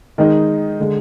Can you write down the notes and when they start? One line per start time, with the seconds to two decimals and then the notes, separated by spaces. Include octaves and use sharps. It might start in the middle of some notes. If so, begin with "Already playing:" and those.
0.18 D#3 G#3 D#4
0.80 D3 G#3